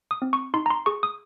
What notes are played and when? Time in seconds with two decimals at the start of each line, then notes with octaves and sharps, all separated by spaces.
0.11 D#6
0.22 C4
0.33 C#6
0.54 D#4 C6
0.66 A#5
0.70 C6
0.86 G#4 C#6
1.03 D#6